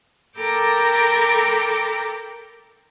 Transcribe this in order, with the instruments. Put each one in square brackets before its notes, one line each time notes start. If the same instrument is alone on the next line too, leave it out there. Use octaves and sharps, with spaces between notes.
[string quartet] A4 A#4 G5 B5 D6